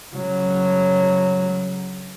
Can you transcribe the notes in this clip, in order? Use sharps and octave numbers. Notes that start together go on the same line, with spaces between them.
C#3 F#3